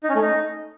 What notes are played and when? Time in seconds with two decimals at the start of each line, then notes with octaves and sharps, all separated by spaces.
0.03 D#4
0.09 C#4
0.15 A3
0.21 D#4